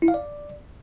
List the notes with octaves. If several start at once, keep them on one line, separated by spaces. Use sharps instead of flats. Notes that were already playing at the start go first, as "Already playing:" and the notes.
E4
F5
D5